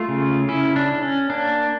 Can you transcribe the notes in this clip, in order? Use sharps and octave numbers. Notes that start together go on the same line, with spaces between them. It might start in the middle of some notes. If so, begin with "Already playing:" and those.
Already playing: A3 F4
C#3
C#4 E4
D4
C#4
C#4
A#3 D4